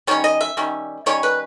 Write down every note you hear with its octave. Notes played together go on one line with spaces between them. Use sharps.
D#3 G3 C#4 C#5
D#5
E5
D#3 G3 C#4
D#3 G3 C#4 C#5
B4